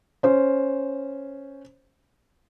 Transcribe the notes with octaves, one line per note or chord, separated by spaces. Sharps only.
C#4 C5